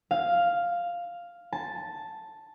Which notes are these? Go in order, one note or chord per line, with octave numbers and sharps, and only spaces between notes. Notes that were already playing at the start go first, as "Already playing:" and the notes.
F5
A5